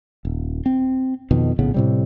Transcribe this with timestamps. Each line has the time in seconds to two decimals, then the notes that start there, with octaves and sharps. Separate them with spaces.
0.25 D#1
0.66 C4
1.31 F2 B2 D#3
1.59 A#1 A2 C#3 B3
1.74 A2 C3 G3